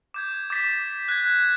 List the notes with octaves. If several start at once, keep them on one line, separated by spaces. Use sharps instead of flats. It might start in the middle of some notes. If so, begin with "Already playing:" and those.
D6 G6 G#6
D6 G6 A6 B6 E7
F#6 G#6